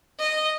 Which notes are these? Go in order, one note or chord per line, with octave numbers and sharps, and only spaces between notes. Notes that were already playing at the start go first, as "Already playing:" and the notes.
D#5